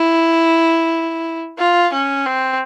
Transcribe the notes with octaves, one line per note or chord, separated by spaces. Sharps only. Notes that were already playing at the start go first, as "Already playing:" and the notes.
Already playing: E4
F4
C#4
C4